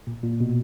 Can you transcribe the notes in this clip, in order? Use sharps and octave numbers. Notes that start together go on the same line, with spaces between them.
A#2
A#2
B2